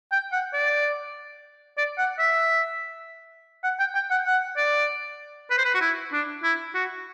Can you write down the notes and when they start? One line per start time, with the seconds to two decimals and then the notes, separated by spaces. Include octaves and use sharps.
0.12 G5
0.32 F#5
0.53 D5
1.77 D5
1.98 F#5
2.19 E5
3.64 F#5
3.79 G5
3.95 G5
4.10 F#5
4.26 F#5
4.57 D5
5.50 B4
5.58 C5
5.65 B4
5.74 F#4
5.81 E4
6.12 D4
6.43 E4
6.74 F#4